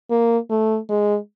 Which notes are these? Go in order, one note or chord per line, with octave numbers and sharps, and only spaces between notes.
A#3
A3
G#3